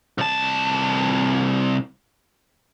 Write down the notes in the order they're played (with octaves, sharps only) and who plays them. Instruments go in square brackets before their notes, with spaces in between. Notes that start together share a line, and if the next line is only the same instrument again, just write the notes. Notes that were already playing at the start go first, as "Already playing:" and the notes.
[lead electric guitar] C2 A5